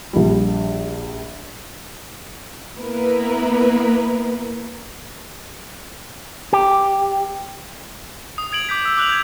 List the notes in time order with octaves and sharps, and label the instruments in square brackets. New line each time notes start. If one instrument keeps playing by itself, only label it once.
[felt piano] A#1 G3
[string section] A#3 B3 E4 A#4 B4
[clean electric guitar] G4
[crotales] D#6
D#6 G#6 D7 F#7
D6 G6 B6
E6
D6 F#6 F7 F#7
G6 G#6